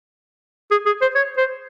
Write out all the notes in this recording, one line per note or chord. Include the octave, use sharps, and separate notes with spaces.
G#4
G#4
C5
C#5
C5